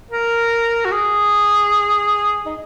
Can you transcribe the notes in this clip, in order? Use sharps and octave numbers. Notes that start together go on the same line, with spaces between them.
A#4
F#4
G#4
D#4